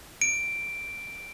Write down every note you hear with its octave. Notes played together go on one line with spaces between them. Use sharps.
D7